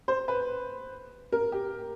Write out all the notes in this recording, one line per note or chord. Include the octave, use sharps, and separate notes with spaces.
C5
B4
A#4
G4